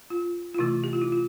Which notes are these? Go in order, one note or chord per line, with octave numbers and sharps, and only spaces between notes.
F4
F4
C3 E3 A3 E4
G4
F4
E4
F4